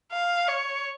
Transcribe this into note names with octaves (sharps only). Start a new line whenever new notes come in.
F5
C#5